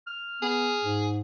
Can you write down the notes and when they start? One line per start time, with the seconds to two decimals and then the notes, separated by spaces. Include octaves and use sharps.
0.07 F6
0.42 B3 G#4
0.84 G#2